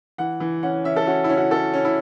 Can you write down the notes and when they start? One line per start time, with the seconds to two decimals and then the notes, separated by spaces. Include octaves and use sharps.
0.18 E3 F#5
0.40 E3
0.63 C#4 F#5
0.84 C#4 E5
0.96 A4
1.07 C#4 F#4
1.24 E4
1.29 C#4
1.37 F#4
1.51 C#4 A4
1.73 C#4
1.85 E4